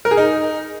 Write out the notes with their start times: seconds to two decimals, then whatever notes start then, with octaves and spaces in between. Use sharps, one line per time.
0.05 A#4
0.11 G#4
0.17 D#4